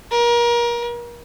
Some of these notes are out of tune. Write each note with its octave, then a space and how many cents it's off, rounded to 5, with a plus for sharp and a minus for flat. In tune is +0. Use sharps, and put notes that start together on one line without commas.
A#4 +30